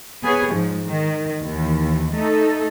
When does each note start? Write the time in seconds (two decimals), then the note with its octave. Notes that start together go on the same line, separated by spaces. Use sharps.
0.23 B3 G#4 C#5
0.53 G#2 F3
0.85 D#3
1.42 D#2 E3
2.13 A3 D#4 A4